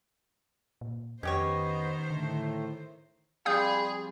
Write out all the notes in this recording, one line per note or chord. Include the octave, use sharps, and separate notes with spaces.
A#2
F2 D#3 B3 C#4 G4 C5 C#5 D#5
A2 D3 A3
F3 G3 C4 G#4 F5 D#6 G6